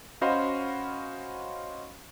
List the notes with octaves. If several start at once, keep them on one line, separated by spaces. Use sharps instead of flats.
C#4 F#4 C5 D#5 F5 B5